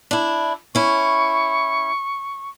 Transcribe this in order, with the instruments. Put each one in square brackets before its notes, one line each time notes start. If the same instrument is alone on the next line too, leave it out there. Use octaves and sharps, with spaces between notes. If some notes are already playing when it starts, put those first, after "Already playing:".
[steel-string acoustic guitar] D4 E4
[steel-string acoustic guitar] C#4 E4 [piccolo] C#6